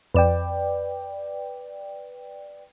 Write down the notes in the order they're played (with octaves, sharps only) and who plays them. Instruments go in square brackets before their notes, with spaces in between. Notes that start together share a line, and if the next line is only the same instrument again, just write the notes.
[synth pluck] F2 E7 [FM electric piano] B4 D5 G5